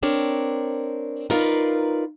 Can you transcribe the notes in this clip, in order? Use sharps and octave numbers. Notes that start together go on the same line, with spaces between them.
C4 D4 A#4 C#5
D#4 F4 A#4 B4 D5 F5